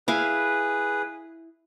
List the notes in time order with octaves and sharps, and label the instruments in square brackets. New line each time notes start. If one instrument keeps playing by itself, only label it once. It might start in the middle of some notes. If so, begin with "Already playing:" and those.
[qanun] E4 F5 G#5 [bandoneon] G#4 B4